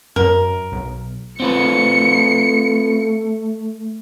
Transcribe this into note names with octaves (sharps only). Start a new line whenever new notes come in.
F#2 A#4
B1
A3 C4 F4 B4 C#7